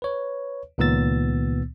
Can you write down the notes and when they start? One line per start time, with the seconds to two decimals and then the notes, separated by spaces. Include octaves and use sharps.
0.02 B4 C#5
0.78 C#2 A#2 D#3 B3 E6 A6